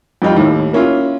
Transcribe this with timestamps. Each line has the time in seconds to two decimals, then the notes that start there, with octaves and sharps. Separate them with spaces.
0.22 F2 G#2 G3 D#4 F4 G5
0.36 D#2 A2
0.73 A#3 C#4 E4 F4